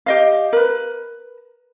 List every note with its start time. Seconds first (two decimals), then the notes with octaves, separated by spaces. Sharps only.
0.06 G4 D#5 F5
0.53 A#4 B4